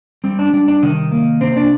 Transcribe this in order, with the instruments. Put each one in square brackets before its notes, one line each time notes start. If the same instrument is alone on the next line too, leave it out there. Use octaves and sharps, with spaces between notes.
[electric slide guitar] G3 C4
D4
G3 D4
D4
C3 D#3 D#4
A#3
C3 C4
D4